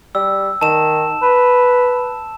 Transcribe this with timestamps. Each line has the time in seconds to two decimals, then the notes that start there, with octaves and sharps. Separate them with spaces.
0.15 G3 E6
0.61 D#3 A5 E7
1.22 B4